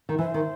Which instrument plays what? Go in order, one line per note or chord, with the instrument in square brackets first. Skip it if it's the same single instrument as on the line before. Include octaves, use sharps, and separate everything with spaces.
[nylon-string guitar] D#3
[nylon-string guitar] E3 [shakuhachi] C5
[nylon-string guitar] D#3